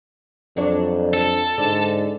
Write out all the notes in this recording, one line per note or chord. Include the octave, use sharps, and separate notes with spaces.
F2 F#3 D4 C#5
A4
G#2 D3